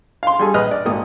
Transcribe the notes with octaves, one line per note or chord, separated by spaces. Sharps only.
F5 C6
G3 G#4 A4
A#1 B4 D#5 B5 D#6 F6
D5
G#1 A#3 D#6